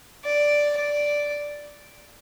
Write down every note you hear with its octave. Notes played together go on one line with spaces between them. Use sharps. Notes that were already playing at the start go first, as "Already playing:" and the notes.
D5
D5